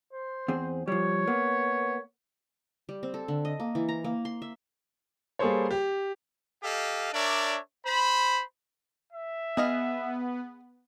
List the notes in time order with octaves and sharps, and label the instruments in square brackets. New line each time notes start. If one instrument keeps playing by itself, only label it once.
[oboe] C5
[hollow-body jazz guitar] E2 C4 G#4
[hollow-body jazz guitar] F3 G3 [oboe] C#5
[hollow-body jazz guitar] A#3 B3
[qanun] G3
C4
A4
D3
D#5
A#3
E3
A#5
A#3
C6
E5
[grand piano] G3 A#3 G#4 A4 C5 C#5
G4
[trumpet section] G4 A4 D#5 F5
D4 A#4 C#5 D5 E5
C5 B5
[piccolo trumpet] E5
[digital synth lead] B3 [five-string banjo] G#4 D#5 F5